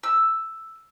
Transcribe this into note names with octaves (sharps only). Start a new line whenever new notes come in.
E6